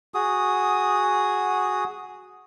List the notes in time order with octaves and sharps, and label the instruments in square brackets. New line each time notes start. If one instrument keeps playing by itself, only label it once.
[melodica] F#4 G#4 D#6